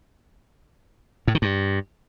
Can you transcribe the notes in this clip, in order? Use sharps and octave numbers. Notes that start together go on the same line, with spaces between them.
A2
D#3
G2